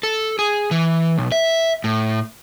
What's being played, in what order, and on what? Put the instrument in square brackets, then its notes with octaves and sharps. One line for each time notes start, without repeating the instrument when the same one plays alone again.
[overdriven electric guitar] A4
G#4
E3
B1
E5
A2